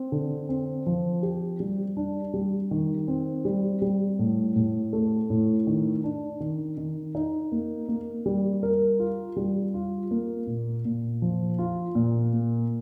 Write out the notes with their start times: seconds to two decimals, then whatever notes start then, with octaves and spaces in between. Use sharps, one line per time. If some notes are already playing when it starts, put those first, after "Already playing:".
Already playing: C4
0.12 D3
0.49 C4
0.86 F3
1.23 G4
1.60 G3
1.97 D4
2.34 G3
2.71 D#3
3.08 C4
3.45 G3
3.82 G3
4.19 A2
4.56 A2
4.93 A3
5.30 A2
5.67 D#3
6.04 D4
6.40 D#3
6.77 D#3
7.15 D#4
7.52 A#3
7.88 A#3
8.26 G3
8.63 A#4
8.99 F4
9.36 G3
9.74 F4
10.11 A#3
10.47 A#2
10.85 A#2
11.22 F3
11.58 F4
11.95 A#2
12.33 A#3